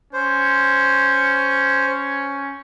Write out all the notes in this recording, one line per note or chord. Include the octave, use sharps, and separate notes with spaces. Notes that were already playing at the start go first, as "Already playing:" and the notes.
C#4 C5